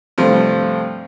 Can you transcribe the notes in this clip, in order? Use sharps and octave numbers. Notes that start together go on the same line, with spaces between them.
G2 C3 F3 A3